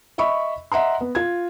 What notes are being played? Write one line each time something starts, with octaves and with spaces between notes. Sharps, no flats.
D#5 E5 B5 C#6
D#5 E5 F#5 A#5 C6
B3
F4 G#6